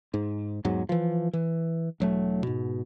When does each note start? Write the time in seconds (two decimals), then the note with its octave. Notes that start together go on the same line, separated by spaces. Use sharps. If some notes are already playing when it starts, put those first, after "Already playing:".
0.14 G#2
0.65 E2 G#2 F#3
0.89 E3 F3
1.33 E3
2.00 E1 F#3 A3
2.43 G#2 B2